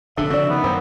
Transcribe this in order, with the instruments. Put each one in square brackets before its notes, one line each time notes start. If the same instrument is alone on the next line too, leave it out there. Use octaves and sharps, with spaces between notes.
[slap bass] F1 B2 [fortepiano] D3 [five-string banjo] D4 [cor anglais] E5
[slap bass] C#3 F3 C4 [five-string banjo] F#4 D5
[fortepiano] D#3 [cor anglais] B3
[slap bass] F#2 [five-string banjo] F#3 A#3 C4